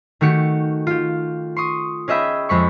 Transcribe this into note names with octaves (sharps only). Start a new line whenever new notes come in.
D#3 A3 F#4 G4 C#7
F4 G4
C6 C#6 D#6
C#4 G#4 D#5 E5 G5 B5
F2 G#3 B5 C#6